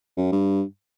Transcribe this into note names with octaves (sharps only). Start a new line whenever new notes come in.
F#2
G2